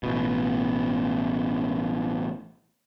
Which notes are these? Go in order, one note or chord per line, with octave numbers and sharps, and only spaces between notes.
A1 B2